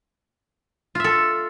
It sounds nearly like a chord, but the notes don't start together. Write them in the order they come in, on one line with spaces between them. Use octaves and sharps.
F4 E5 A4